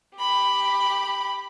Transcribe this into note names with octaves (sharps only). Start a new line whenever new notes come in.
G4 B5